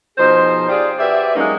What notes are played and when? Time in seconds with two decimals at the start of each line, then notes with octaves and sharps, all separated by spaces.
0.18 B2 F3 D#4 G#4 C5
0.68 F4 G4 G#4 C5 D5
0.98 F#4 G4 B4 D5 E5
1.36 E3 F#3 G#3 A#3 C#4 D#4